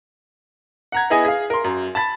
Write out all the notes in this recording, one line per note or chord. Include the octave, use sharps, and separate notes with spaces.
F#5 A#5 G#6
B3 E4 G#4 D#5 G#5
G#4 F5
A#4 C6
F#2
A5 B5 A6